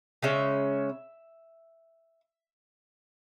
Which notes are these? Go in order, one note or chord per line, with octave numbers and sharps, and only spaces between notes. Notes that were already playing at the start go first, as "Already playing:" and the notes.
C#3 G#3 C#4 E5